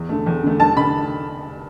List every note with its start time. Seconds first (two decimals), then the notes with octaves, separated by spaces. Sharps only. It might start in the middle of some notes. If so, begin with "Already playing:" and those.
Already playing: E2
0.09 D3 A3
0.26 E2
0.43 D3 A3
0.60 G2 A5
0.76 D3 B5